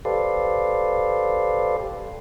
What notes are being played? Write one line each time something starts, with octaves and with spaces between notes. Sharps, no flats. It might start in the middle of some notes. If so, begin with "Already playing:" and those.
G4 A4 B4 C5 D5 F5